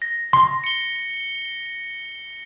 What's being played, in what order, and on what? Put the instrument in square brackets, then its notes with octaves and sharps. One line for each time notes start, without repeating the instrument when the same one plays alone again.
[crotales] A#6
[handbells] C6
[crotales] C#7 G7